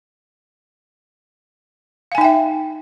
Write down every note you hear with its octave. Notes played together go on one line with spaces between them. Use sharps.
D#4 E5 F5 G5 G#5